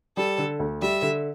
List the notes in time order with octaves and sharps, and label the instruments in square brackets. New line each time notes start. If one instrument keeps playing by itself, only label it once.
[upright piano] G3 [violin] A4
[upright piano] D3
D2
[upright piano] G3 [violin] E5
[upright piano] D3